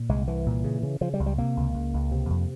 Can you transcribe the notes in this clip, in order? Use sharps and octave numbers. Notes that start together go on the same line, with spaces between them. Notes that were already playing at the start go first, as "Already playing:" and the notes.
Already playing: A#2
C2 G#3
C2 E3
A#2
C#3
C#3
C#3 F3
G3
C#2
G3
C3 A#3
C#2
C#2
C#2
C3
F2